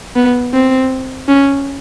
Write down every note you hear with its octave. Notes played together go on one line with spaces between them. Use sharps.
B3
C4
C#4